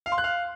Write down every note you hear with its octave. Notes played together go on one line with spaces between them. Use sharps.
F5
C6
F#6
F5